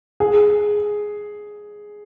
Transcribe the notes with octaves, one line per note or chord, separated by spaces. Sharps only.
G#4